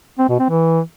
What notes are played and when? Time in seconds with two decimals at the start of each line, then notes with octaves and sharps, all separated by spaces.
0.19 C4
0.29 B2
0.39 C4
0.50 E3